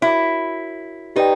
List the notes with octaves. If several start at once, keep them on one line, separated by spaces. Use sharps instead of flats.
E4 F#4 A#4 C#5
D#4 G4 B4 D5 G5